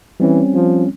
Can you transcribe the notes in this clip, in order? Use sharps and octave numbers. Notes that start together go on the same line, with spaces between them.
E3 G3 C4 C#4
F3